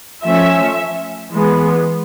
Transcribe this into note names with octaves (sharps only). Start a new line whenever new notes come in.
F3 A3 C#4 E5
E3 G#3 B3